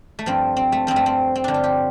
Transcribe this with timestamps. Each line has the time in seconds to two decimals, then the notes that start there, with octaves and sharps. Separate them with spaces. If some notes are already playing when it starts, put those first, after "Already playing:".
0.19 A3
0.26 G2 F3 C4
0.57 C4
0.72 A3
0.87 G2 F3 C4
0.96 A3
1.06 C4
1.35 C4
1.44 G2 D3 F3 D4
1.54 F4
1.64 G4